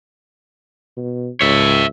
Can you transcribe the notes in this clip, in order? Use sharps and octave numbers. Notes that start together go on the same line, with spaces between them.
B2
C#2 C#5 E5